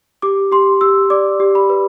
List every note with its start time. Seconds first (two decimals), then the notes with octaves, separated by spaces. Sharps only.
0.22 G4 D6
0.52 G4 C6
0.81 G4 E6
1.10 D5 D6
1.40 G4
1.55 B5
1.70 B4